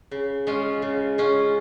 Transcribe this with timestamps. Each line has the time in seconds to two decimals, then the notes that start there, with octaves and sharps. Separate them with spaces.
0.11 C#3
0.47 G#3 C#4 F4
0.82 C#3
1.18 G#3 C#4 F4